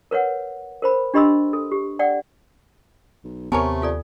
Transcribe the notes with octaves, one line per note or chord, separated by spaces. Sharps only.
A#4 B4 C#5 F#5
A#4 C5 B5
D4 G4 D#5 B5 C6 E6
A4
G4
D5 F#5 G5
B1
D#2 C3 A3 B3 A#4 C#5 G#5 A5
F4 A4 D5